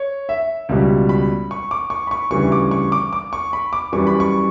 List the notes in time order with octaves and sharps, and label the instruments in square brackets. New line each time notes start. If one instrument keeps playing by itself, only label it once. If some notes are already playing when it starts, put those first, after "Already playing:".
Already playing: [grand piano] C#5
E5
C#2 B2 G3
B5
C#6
D6
C#6
B5
C#6
D2 C#3 E3 G3 C#6
D6
C#6
D6
D6
C#6
B5
D6
F#2 E3 G3 C#6
B5
C#6